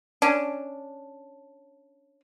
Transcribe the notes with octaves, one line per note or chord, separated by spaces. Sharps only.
C#4 D4